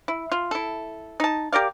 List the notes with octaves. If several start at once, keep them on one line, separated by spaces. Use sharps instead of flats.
E4
F4
E4 A4
D#4 A5
G4 A#4 D5 F5